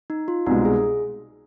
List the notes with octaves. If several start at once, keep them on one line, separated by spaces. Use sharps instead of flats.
D#4
F4
C2 B2 G#3 D#4
G#4